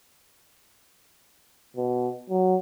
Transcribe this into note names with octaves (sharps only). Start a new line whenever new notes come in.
B2
F#3